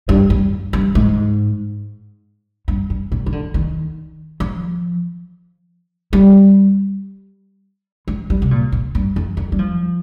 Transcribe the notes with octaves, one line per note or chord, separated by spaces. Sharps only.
G2
G2
G2
G#2
G2
G2
A#2
D#3
D3
D#3
F3
G3
G#3
G3
C3
A#2
A#2
G2
F2
D#3
G3
F3